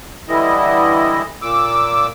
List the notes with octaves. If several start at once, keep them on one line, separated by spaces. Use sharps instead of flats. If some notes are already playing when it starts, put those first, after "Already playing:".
D3 E3 G3 E4 D#5
A#2 D6 E6